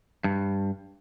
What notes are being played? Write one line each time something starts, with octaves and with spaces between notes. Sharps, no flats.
G2